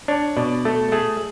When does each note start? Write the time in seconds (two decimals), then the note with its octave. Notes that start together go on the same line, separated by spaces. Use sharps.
0.08 D4 C#5
0.36 B2 D5
0.65 A3 A4
0.92 A3 G#4